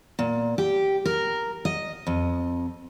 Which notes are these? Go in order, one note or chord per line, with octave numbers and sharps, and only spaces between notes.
A#2
G4
A#4
D#5
F2